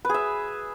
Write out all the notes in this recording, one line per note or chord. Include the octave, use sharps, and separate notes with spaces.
G#4 B4 E5